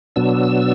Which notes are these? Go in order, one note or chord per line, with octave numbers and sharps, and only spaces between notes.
B2 F#3 B3 D4 E6